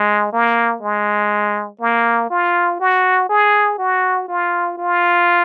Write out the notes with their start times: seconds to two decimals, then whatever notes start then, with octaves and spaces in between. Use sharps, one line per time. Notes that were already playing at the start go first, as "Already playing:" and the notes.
Already playing: G#3
0.32 A#3
0.82 G#3
1.81 A#3
2.30 F4
2.80 F#4
3.29 G#4
3.78 F#4
4.28 F4
4.78 F4